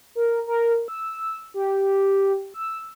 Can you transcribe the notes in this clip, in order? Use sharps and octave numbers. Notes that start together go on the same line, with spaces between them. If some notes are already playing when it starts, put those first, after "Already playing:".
A#4
A#4
E6
G4
E6